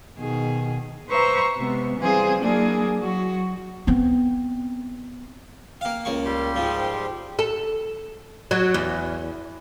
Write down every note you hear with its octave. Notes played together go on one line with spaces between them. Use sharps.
B2 D#3 G#4
B4 C5 E5 A#5 C#6
C3 G#3 B3
E3 G3 C4 F4 G#4 C5
F#3 A#3 D4 E4 G#4
F#3 F#4
B3 C4
A#3 F5 G5
C#2 A#3 A#4 C#6
G3 G4 C6
G#2 F3 G5
A4
F#3
E2